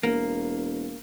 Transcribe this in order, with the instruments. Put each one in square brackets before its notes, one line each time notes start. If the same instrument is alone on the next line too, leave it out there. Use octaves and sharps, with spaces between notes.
[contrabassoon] E1 [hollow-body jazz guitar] A#3